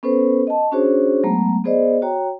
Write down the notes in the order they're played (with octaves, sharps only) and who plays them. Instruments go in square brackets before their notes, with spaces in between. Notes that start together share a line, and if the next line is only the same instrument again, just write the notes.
[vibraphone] B3 C#4 A4 B4 C5
D#5 A5
C#4 D4 F#4 G#4 C5 C#5
F#3 G#3 A3 B3 A#5
B3 G#4 C5 D5 D#5
F#4 C#5 G5 A#5